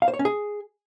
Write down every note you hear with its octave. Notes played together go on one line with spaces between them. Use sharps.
F5
C5
C#5
C#4
G#4